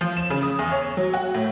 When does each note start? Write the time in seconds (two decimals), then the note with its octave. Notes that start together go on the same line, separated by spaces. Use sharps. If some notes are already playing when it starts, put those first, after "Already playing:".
0.01 F3
0.17 E7
0.30 C#3
0.43 D#6
0.59 E2
0.72 C#5
0.97 F#3
1.13 F#4
1.34 A2